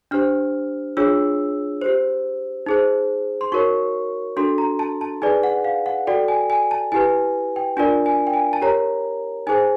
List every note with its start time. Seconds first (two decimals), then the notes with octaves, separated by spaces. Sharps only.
0.11 D4 G4 C5 F6
0.97 D4 F4 G#4 C#5 E6
1.82 G4 C5
2.66 D#4 G#4 C5
3.41 C6
3.52 D#4 F#4 A#4 C#5 C#6
4.37 D4 F#4 A4 C6
4.58 A#5
4.79 A5
5.01 A5
5.22 D#4 G#4 B4 D5 G#5
5.43 F#5
5.64 F5
5.86 F#5
6.07 F#4 A4 D5 G5
6.28 G#5
6.50 G#5
6.71 A5
6.92 E4 G4 B4 G#5
7.56 G5
7.77 D4 F4 A#4 D5 G#5
8.06 G#5
8.27 G5
8.34 G#5
8.53 A5
8.62 G4 A#4 C#5 A#5
9.47 D#4 G#4 C5 G#5